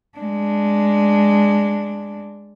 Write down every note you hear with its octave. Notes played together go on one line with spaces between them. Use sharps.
G#3 D4